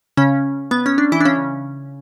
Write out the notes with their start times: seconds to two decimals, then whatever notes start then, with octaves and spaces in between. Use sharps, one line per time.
0.17 C#3 C#4
0.71 B3
0.86 C#4
0.98 D4
1.12 E3 E4
1.20 D4
1.25 C#3 C#4